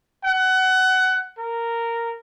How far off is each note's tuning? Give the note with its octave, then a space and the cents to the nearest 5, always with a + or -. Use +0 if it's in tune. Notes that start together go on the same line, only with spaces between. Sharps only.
F#5 +20
A#4 -10